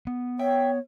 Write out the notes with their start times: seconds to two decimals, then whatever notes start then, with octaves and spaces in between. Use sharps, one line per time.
0.07 B3
0.39 C#5 E5 G5